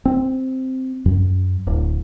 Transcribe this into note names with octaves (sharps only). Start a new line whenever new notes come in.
C4
F#2
D1